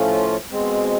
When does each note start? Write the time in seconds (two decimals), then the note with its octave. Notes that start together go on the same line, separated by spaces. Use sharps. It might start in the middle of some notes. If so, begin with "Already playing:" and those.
Already playing: A2 F3 A3 C#4 F4
0.51 B2 G#3 C4